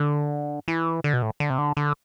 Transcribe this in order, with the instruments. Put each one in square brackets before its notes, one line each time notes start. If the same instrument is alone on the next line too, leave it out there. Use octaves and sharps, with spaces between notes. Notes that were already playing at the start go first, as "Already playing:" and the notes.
Already playing: [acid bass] D3
E3
D3
B2
A2
D3
C3
D3
D3